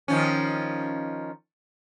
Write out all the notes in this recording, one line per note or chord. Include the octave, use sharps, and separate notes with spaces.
D#3 F3 C#4